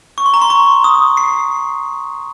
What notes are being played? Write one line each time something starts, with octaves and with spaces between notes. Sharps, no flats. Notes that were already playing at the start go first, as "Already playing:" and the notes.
C#6
C6
A#5
C6
C#6
D#6
C7